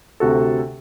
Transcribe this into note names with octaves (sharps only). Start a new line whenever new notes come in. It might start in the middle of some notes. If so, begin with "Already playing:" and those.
D2 C3 F#4 A4